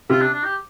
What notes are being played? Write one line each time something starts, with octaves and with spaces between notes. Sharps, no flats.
C3 F4
D4
D4
G4